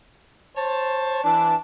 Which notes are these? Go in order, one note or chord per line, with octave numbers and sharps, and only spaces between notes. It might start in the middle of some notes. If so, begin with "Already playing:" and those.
C5 C#5 A5
E3 D4 A5